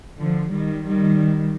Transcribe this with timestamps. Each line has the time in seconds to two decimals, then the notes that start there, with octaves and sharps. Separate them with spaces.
0.19 D3 F3
0.52 D#3 G3
0.85 D#3 G3